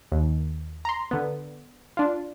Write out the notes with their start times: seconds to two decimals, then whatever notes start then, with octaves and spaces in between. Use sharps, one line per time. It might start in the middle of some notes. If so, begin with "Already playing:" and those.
0.12 D#2
0.85 A#5 C6
1.11 D3 B3
1.97 D4 F4